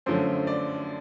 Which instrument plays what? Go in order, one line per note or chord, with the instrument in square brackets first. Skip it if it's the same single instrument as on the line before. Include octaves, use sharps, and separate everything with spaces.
[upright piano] F#2 D3 F3 A3 C#4 C5
D5